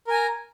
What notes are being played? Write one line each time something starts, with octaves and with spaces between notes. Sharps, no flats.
A#4 G#5 A#5